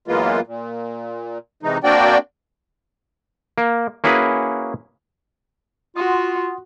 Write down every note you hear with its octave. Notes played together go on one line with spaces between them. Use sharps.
F#2 E3 G#3 A#3 B3 F4
A#2
C3 E3 G#3 D#4
A#3 C4 D4 F#4 D5 G5
A#3
A#3 C#4 E4 F#4 G#4 B4
F4 F#4 F#5 C6 D#6